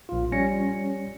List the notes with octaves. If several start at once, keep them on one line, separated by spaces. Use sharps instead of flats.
A#1 F4
G3 C#4 A#6 C#7